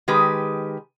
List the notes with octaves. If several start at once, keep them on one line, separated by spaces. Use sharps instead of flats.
D#3 G#3 G4 B4